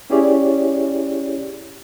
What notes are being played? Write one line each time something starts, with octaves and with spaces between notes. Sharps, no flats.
C#4 E4 G4 G#4 C#5 D5